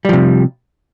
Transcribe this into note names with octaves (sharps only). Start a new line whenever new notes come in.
C3 F3 G3